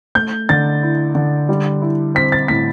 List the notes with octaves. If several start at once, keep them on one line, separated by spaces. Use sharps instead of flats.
A3 G6
D3 A6
E4
D3
G3
E4
C4 B6
A6
A2 B6